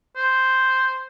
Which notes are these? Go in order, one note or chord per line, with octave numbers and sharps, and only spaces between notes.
C5